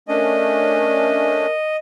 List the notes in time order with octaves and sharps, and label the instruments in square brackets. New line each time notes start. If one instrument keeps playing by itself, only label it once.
[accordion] A3 C#4 D4 [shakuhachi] A#4 [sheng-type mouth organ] D#5